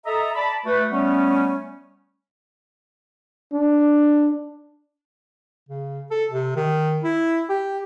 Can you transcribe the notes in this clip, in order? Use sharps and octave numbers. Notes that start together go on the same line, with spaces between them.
A4 D#5 E5 A#5
D5 A5 B5
A3 F#4 B4
G3 A3 B3 C#4
D4
C#3
A4
C3
D#3
E4
G4